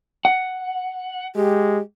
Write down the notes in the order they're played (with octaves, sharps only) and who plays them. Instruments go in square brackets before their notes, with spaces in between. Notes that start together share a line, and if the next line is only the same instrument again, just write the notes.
[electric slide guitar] F#5
[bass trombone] G#3 [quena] G4